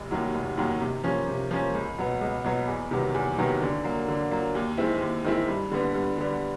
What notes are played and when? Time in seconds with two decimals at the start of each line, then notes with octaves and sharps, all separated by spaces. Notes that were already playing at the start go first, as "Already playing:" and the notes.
Already playing: F1
0.11 D#2 D#3 F#3
0.34 F1
0.57 D#2 D#3 F#3
0.81 C3
1.04 F3 A#3 C#4
1.28 C3
1.51 F3 A#3 C#4
1.75 C#2
1.98 B2 F#3 B3
2.21 C#2
2.44 B2 F#3 B3
2.68 E2
2.91 C3 D#3 F#3 B3
3.15 E2
3.38 C3 D#3 F#3 B3
3.62 D3
3.84 F#3 A#3
4.08 D3
4.31 F#3 A#3
4.55 D#2
4.78 D#3 G#3 C4 E4
5.01 D#2
5.25 D#3 G#3 C4 E4
5.48 G2
5.72 D3 G3 B3
5.95 G2
6.18 D3 G3 B3